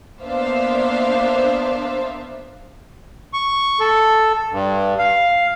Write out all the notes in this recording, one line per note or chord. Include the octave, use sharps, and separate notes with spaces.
A#3 B3 D4 C5 E5 F5
C#6
A4
G2
F5